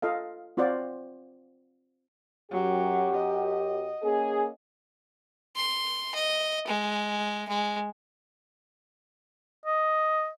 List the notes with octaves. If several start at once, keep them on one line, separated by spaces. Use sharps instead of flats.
F4 A4 D#5 F5
C4 F4 F#4 C5 D5
F#2 F#3 G4
D#5
A#3 C#4 G#4
C6
D#5
G#3
G#3
D#5